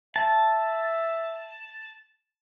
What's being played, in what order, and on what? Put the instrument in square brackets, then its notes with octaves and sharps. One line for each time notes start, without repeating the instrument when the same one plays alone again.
[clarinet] E5 [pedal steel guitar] A5